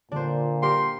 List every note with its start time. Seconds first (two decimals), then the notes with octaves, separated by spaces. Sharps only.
0.12 A#2 D3 D4 C5
0.63 G4 A#4 C6